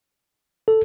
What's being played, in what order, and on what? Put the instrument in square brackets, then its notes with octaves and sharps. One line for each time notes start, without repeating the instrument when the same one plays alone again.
[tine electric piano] A4